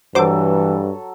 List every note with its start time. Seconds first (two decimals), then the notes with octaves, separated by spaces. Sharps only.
0.15 G2 E3 F#3 A4 C5 D6